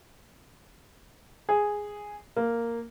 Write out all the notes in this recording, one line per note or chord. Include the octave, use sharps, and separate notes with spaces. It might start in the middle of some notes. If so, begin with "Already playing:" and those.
G#4
A#3